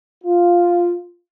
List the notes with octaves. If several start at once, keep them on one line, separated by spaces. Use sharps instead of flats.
F4